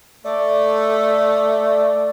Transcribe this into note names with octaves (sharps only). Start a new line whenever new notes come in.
A3 D5